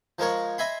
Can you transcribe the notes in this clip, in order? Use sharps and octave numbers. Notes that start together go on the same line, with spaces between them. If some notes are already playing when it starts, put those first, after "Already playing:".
F3 G#3 A#4 C#5
D#5 E5 G#5 B5 C6